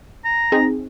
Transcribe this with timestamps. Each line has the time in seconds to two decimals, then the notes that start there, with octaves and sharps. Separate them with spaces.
0.25 A#5
0.52 C4 D#4 G#4